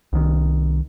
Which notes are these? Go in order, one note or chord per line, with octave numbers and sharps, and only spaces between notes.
C2 D#3